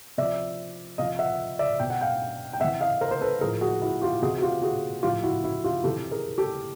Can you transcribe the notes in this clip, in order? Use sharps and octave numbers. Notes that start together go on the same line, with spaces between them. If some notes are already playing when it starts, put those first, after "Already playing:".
C3 F3 D5 E5
C3 F3 D#5 F5
E5 F#5
D5 E5
B2 G5
F#5
F5 G5
G5
C3 E3 E5 F#5
D#5 F5
A#4 C5
C5
A4 B4
A2 F3 G#4 A#4
F#4 G#4
E4 F#4
F4 G4
C3 E3 F#4 G#4
F#4
F4 G4
F#4 G#4
A2 F3 F4 G4
E4 F#4
E4 F#4
F4 G4
C3 E3 G4 A4
G#4 A#4
G4 A4